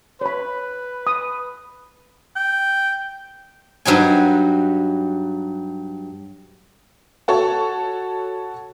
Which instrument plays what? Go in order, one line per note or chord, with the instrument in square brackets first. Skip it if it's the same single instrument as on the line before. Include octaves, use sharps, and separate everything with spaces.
[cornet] B4 [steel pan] C#5 B5
[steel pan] D#6
[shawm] G5
[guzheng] G2 F#3 D#4 G#5
[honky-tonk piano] F#4 A4 C#5 C#6